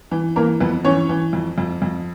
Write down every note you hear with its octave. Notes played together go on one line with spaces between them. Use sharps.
E3
E3 A#3 A#4
F2 B3 B4
E3 C#4 C#5
E3
F2
F2
F2